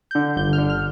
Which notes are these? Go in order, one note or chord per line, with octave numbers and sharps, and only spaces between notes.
D3 G6
G1 G6
F6
D3
F6